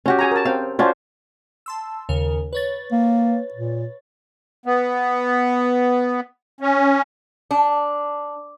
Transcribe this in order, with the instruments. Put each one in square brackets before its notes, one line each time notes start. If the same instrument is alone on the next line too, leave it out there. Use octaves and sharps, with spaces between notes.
[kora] C#4 F#4 G4
[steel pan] G#4 G#5 A#5
A#4 A5
[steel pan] C4 G5 [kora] F5
[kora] C#4 D4 F4 [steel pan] F#4 C5
[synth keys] A5 C6 E6
D#2 C#3 A#4
B4 C#5 A6
[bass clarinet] A#3
A#2
[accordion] B3
C#4
[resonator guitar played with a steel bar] D4